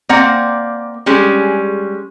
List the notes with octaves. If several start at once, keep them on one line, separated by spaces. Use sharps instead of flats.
A#3 C4 D5 F#5
G3 G#3 C#4 G#4